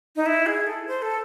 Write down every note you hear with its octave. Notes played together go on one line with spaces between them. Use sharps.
D#4
E4
G#4
A4
C5
A4